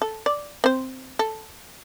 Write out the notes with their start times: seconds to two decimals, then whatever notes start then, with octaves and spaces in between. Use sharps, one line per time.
0.02 A4
0.26 D5
0.64 C4 C5
1.19 A4